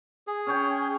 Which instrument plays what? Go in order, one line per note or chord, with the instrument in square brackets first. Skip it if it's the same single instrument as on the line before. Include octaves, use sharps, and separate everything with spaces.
[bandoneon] G#4
[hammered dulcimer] C#4 C#5 G5